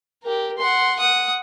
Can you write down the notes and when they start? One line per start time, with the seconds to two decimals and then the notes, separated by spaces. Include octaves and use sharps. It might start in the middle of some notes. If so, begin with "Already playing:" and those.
0.23 G4 A#4
0.58 F#5 C6
0.99 F#5 D#6